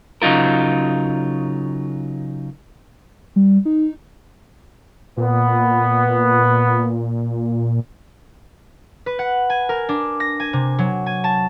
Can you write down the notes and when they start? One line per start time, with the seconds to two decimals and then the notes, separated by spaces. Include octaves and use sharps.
0.22 C#3 F#3 D#4 F4 A#4
3.36 G3
3.65 D#4
5.17 A#2 B3
9.06 B4
9.19 F#5
9.50 G#5
9.69 A#4
9.89 D4
10.20 A#6
10.40 G#5
10.53 C3
10.79 F#3
11.06 G#5
11.24 A5